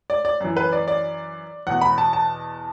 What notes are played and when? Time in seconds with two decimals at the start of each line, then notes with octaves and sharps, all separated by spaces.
0.10 D5
0.25 D5
0.40 F#2 E3
0.57 B4
0.73 D5
0.88 D5
1.67 E2 B2 F#5
1.81 B5
1.98 A5
2.13 A5